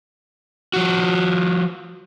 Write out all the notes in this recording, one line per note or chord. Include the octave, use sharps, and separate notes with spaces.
F3 F#4